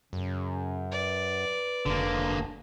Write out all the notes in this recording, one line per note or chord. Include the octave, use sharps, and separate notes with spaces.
F#2 C#3
B4 D5
F1 D3 A#3